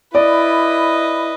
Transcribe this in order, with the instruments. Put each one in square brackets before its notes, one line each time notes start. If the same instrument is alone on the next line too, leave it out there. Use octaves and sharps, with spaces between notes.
[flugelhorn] E4 [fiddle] B4 [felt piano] D5 [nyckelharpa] D#5